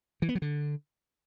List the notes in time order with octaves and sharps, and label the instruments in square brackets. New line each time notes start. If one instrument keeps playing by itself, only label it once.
[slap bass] E3
B3
F#3
D3